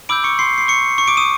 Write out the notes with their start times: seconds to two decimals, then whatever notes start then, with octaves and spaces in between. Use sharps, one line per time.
0.09 B5 D6 E6 G6 D7
0.24 C#6 C#7
0.39 C6 C7
0.58 C7
0.68 C#6 C#7
0.98 C#6 C#7
1.08 D6 D7
1.17 D#6 D#7